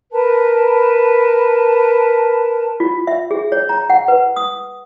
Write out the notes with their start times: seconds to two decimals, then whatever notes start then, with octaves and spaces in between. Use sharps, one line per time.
0.12 A#4 B4 A5
2.80 F4
3.07 E5
3.31 G#4
3.52 C#5
3.69 A#5
3.90 F#5
4.08 B4
4.36 D#6